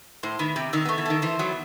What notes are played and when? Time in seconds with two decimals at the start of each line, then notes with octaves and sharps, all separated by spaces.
0.23 A2 C5
0.39 D#3 B3
0.56 C3 G4
0.73 D#3 E5
0.85 A3 B3
0.98 E3
1.06 D#3 A4
1.22 E3 C5
1.39 F#3 B3